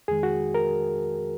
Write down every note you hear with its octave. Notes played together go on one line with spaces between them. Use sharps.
F2 D#3 G#3 G#4
F#4
A#4